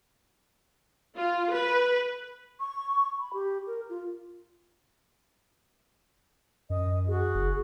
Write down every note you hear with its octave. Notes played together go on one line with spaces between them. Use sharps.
F4
B4
C#6
B5
G4
A#4
F4
F#2 D#5
F#4 G#4
F#1